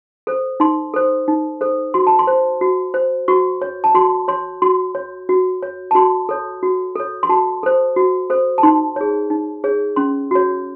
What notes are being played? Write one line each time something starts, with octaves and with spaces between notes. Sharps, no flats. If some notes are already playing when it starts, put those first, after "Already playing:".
A4 C5
D#4 C6
A4 C5
D#4
A4 C5
F#4 C6
A5
C6
C5
F#4
C5
F#4 C#6
C#5
A5
F#4 C6
C#5 C6
F#4 C6
C#5
F#4
C#5
A5
F#4 C6
A4 C#5
F#4
A4 C#5
C6
F#4 A5
A4 C5
F#4
A4 C5
A5
D#4 C6
G#4 C#5
D#4
G#4 C#5
C#4 C6
F#4 C#5